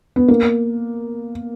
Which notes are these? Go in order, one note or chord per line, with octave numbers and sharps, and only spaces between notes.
B3
A#3